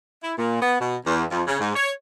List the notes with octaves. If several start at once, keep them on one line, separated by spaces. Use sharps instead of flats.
E4
A#2
B3
B2
E2
F2
C#3
G#2
C#5